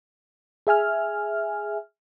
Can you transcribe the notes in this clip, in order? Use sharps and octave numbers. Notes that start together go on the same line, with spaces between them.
G#4 E5 G#5 F6